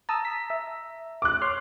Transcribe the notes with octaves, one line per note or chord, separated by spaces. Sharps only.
A5 A#5 D#6 E6
B6
E5
D6 F#6
C#5 C6 F6